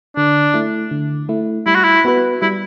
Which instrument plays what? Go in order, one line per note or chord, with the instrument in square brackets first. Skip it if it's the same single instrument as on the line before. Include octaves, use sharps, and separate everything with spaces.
[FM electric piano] D3 [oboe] D4
[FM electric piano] A3 E4
D3
A3 E4
[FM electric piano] G3 [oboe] E4
[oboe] F#4
E4
[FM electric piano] B3 F#4 B4
[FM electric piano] G3 [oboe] E4